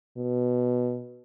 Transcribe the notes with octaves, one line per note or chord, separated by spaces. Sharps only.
B2